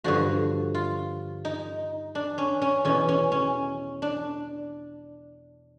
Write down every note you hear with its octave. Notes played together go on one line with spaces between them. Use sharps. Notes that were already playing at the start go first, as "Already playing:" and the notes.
G2 D3 F3 F#4
F4
D#4
D4
C#4
C#4
E2 B2 C#4
C#4
C#4
D4